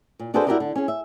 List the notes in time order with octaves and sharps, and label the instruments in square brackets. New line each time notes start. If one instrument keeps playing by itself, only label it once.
[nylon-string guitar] A#2
D4 F#4 G#4 A4 B4 C5
E4 F#4 G4 A#4 D5 D#5
D3
C#4 G#4
E5